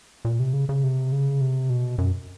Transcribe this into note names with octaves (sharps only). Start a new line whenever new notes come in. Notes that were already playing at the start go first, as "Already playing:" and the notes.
A#2
C3
C#3
C#3
C3
C#3
C3
B2
F#2